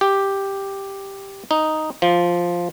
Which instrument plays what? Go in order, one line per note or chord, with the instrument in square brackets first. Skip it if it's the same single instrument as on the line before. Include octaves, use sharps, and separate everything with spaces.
[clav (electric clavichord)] G4
D#4
F3